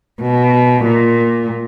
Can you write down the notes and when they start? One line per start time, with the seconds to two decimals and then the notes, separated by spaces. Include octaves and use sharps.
0.22 B2
0.84 A#2